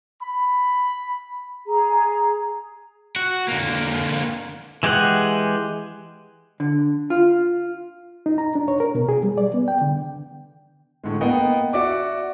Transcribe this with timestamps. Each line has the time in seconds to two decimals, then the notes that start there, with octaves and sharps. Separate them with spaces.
0.20 B5
1.67 G#4 A#5
3.16 F#4
3.48 D3 A#3
4.83 E3 G#3 G4 G#4 F#5
6.60 D3
7.10 F4
8.26 D#4
8.38 A#5
8.55 D4
8.68 C#5
8.80 A#4
8.95 B2
9.09 G#4
9.23 G3
9.38 D5
9.54 B3
9.68 G5
9.82 D3
11.04 A2 D3 G#3
11.21 A#3 B3 D#5 G5
11.73 F#4 D5 E5 D6